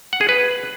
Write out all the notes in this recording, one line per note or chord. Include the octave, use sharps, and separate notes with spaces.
F#5
G#4
B4